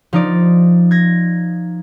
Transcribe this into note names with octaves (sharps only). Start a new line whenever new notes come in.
F3 D#4 D5
G#6 A#6